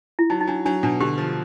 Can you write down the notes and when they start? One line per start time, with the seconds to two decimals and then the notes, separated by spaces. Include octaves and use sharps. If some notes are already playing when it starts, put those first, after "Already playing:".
0.19 E4
0.30 F#3 D#4
0.41 D#4
0.47 F#3 D4
0.65 F#3 D4
0.83 B2 D4
1.00 D3 G4
1.18 F3